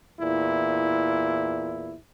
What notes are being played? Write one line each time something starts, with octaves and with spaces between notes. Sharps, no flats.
E2 A#2 E4